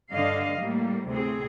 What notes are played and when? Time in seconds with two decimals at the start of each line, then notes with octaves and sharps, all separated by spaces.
0.12 G2 D3 D4 D#5 F5
0.60 A2 G3 A#3
1.09 D2 A2 C3 C4 G#4